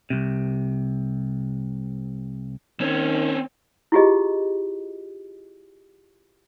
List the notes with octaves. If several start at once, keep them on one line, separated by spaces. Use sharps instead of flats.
C2 C3
D#3 C4 C#4
E4 F4 G4 G#4 D#5